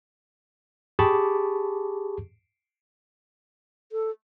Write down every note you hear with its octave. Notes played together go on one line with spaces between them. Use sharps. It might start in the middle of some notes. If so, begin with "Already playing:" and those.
G4 G#4 A5 B5 C#6 D6
A4